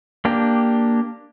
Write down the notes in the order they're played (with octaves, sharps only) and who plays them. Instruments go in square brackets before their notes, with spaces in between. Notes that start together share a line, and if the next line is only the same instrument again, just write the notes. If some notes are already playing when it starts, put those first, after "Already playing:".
[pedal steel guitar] A#3 D4 G4